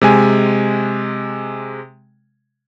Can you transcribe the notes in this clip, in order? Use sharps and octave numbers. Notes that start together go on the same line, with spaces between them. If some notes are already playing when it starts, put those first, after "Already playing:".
C3 G#3 G#5